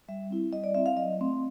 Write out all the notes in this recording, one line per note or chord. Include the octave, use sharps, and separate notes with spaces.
G3 E5
C4 E4
G3 D#5
D5
C4 E4 E5
F5
F#3 D#5
A3 C4